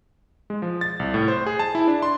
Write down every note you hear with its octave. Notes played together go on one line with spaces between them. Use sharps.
G#3
F3
A6
C2
A2
C5
G#4
A5
E4
D4
C6